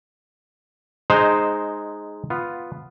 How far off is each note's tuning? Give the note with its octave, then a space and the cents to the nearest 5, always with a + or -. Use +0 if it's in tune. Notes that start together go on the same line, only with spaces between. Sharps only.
G#3 +0 D#4 -10 C5 +0
B3 +0 F4 +0